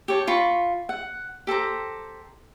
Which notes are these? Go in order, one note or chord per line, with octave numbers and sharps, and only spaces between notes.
G4 C#5 A5
F4 B5 C#6
F#5
G4 A4 C5 A#5